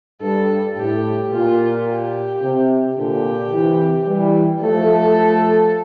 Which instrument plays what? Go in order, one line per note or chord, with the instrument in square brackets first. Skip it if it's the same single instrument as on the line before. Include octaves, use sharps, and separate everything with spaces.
[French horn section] G2 [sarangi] A4
[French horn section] A2 [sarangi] G4
[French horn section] A#2 [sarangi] F4
[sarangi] G4
[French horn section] C3
[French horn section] A#2 D3 [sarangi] G4
[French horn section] C3 E3
E3 G3
[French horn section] F3 A3 [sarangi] A4